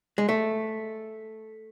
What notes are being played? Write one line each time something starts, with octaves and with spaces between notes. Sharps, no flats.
G#3
A3